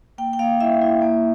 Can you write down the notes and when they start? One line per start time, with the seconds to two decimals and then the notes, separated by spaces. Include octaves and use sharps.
0.18 A#3 G5
0.33 G5
0.39 A#3 F5
0.61 E4 E5
0.82 E4
1.02 A#3